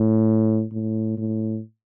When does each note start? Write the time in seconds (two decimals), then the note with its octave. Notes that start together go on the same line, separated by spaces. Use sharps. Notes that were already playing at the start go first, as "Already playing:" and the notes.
Already playing: A2
0.72 A2
1.18 A2